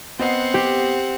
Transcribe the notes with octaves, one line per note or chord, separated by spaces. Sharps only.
B3 C4 D#5 F#5 C7
G4